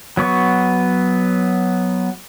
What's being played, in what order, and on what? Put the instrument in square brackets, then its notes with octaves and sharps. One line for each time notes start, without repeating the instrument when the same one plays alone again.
[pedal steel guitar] F#3 B3 C#6